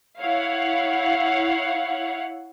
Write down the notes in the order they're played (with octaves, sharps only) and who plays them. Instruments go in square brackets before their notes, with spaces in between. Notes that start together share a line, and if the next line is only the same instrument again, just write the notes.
[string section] E4 C#5 F5 F#5